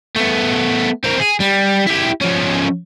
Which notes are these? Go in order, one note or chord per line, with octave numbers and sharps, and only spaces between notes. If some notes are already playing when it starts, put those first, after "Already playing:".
A3 B3
C4 A#4
G#4
G3
E4 G4
F3 C#4